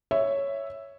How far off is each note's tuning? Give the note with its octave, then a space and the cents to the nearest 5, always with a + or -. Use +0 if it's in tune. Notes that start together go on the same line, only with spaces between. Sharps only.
C#5 +0 E5 +0